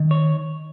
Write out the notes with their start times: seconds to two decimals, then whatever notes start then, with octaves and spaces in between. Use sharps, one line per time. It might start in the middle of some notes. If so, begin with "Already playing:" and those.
Already playing: D#3
0.11 C#5